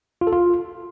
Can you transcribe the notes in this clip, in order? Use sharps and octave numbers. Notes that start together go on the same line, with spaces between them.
F4
A4
F4